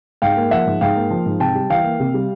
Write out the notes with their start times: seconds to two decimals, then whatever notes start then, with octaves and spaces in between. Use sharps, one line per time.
0.22 G#2 F5 G5
0.37 A#3
0.51 F3 E5 F#5
0.66 G#2
0.81 G#2 F5 G5
0.96 A#3
1.11 F3
1.26 G#2
1.40 C3 G5 A5
1.55 G3
1.70 E3 F5 G5
1.84 A#3
2.00 C3
2.14 G3